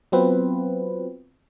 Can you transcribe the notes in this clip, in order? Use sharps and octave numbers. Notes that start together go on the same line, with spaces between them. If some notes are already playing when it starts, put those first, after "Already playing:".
F#3 B3 C4 F4 B4